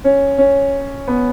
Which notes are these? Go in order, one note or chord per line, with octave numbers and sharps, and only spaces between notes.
C#4
C#4
B3